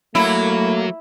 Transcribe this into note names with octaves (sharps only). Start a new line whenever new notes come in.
F#3 A3 A#3 E4